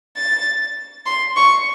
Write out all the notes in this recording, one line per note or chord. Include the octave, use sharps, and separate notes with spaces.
A6
C6
C#6